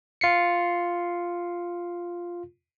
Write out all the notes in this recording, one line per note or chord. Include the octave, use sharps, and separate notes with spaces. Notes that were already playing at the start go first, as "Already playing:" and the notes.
F4 C7 C#7